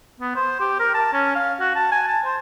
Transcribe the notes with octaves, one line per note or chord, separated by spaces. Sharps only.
B3
C5
G4
A#4
A5
C#4
F5
F#4
A5
G#5
A5
C5